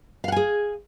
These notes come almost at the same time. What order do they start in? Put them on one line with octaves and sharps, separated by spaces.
F5 F#5 G#5 G#4